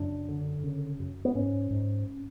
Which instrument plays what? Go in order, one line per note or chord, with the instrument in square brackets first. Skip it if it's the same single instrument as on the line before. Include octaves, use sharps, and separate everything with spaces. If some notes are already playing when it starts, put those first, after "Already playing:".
Already playing: [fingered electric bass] F#2 C#3 D4
D3
C#3
F#2
B3
G#2 C#4
G#2